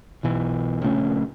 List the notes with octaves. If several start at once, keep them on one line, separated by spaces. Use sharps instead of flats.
B1 B2 E3
A#1 C#3 A3 C#4